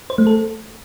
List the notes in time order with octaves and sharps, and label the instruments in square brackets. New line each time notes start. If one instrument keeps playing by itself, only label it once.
[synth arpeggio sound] C5
A3
A4